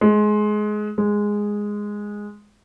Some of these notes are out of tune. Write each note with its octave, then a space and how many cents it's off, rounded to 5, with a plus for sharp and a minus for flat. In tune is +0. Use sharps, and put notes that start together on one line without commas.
G#3 +20
G#3 -5